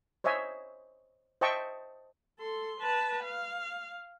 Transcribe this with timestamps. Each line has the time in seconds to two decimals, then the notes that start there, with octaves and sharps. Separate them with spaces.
0.24 C5 C#5 D#5 E5 G#5
1.41 C5 D#5 E5 G5 A5 C#6
2.39 A4 C6
2.80 B4 A5
3.24 F5